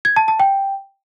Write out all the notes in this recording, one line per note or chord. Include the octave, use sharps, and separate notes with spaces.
G#6
A5
A5
G5